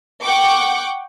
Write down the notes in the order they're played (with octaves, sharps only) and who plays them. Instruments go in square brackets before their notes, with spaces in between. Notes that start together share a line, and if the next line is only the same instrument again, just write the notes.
[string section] F#5 G5 C#6 D6